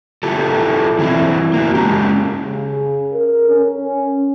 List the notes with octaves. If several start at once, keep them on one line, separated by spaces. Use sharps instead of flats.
E4 F4 G4 A4
E3 C4 E4
A#3 F#4
G#3 C#4 G4
C#3
A#4
C#4